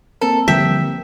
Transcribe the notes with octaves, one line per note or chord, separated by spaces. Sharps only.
A#3 C4 A4 A#4
D3 F3 G3 E5 G5